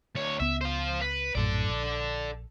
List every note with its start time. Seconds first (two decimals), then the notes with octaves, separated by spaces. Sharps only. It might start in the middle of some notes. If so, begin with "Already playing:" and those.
0.15 D2 C#5
0.40 C#2 B3 E5
0.61 C5 F5
1.01 B4
1.35 A#1 F#2 A2 A4 D5
1.68 A#1